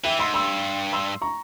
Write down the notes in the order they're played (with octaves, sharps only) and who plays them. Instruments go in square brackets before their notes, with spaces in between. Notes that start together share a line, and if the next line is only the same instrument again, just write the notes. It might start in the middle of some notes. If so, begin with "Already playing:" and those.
[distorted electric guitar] E3 [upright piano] E5 G5
[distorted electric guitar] G#2 [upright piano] C6 E6
[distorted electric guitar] G2 [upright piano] C6 E6
[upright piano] C6 E6
A#5 C#6